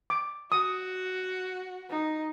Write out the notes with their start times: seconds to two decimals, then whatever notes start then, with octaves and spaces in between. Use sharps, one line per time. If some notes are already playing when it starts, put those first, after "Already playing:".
0.10 D6
0.52 F#4 D#6
1.89 D#4